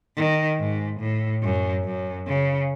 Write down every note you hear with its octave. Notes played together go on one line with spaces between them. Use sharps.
D#3
G#2
A2
F#2
F#2
C#3